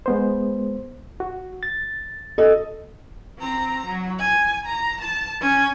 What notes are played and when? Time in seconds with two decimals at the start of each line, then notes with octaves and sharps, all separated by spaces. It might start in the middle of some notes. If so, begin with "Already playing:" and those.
0.06 G#3 B3 C5
1.20 F#4
1.63 A6
2.38 A4 D#5
3.39 C4 A#5
3.86 F#3
4.19 G#5
4.66 A#5
5.01 A5
5.40 C#4 G#5